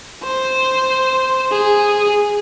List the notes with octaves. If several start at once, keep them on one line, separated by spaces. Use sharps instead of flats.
C5
G#4